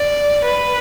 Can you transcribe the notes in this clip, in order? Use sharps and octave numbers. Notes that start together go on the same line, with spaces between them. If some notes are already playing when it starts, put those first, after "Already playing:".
Already playing: D5
B4